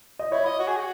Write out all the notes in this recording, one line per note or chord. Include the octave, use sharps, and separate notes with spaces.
D#5
E4 C#5
D#5
F#4
G#4
F#4